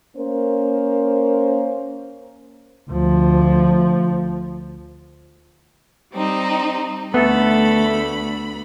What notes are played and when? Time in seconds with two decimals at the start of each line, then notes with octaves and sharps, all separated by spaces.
0.16 A#3 C#4 A#4 C5
2.90 D2 F3
6.12 G3 C4 D#4
7.14 D2 A3 B3 A4 B5